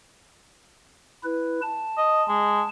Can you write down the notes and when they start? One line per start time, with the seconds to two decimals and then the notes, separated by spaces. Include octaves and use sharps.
1.23 E4 B4
1.62 A5
1.98 D#5
2.28 G#3